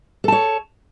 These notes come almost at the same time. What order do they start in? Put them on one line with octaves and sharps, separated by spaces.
A4 A5 C#5